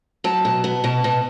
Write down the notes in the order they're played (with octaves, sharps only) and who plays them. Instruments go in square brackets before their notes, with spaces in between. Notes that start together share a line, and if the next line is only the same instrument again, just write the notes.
[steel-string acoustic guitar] F#3 A5
B2
B3
B2 A5
B2